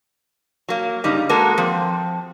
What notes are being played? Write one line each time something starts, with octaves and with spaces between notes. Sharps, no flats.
F#3 A#3
G2 C#3 G3 D#4
G#3 A#3 F#4 A4 A#4
F3 C4